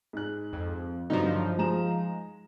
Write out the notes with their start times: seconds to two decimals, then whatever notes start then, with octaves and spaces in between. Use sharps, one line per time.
0.13 G#2 F#6
0.53 F2
1.10 G2 D3 F3 F#3 D#4
1.58 G#3 A#5 E7